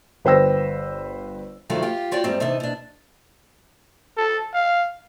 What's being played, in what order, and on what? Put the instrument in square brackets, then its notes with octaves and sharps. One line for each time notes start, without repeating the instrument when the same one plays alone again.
[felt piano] G1 B4 C5 G5 E6 A#6
[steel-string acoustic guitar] G2 C3 D#3 F3 F#3 A3
F4 G4
F4 F#4 C#5 D5 G5
E2 G#2 G3 C4
C3 E3 D4 D#4
B2 D4
[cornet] A4
F5